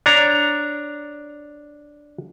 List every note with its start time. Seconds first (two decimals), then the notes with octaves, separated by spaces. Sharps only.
0.06 D4 C#5 A#5